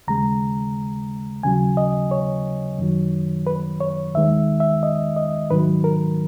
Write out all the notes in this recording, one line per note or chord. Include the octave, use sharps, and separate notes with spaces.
D#2 C#3 G#3 A#5
D#2 C#3 F#3 G#5
D#5
C#5
F#2 D#3 F#3
B4
C#5
D#2 D#3 G#3 E5
E5
D#5
D#5
G#2 D#3 F#3 B4
A#4